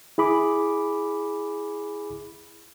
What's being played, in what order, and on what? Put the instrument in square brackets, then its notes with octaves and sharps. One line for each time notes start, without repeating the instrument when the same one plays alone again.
[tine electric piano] E4 G#4 B5 D6